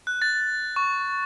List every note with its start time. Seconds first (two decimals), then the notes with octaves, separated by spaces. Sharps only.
0.07 F#6
0.22 A6
0.76 C#6